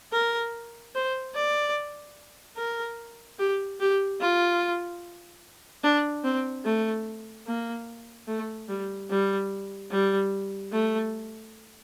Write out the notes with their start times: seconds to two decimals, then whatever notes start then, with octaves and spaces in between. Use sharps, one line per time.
0.12 A#4
0.95 C5
1.35 D5
2.57 A#4
3.39 G4
3.80 G4
4.21 F4
5.84 D4
6.24 C4
6.65 A3
7.47 A#3
8.28 A3
8.69 G3
9.10 G3
9.91 G3
10.72 A3